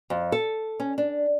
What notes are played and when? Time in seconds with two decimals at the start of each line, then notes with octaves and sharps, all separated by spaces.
0.10 F2
0.32 A4
0.80 C#4
0.98 D4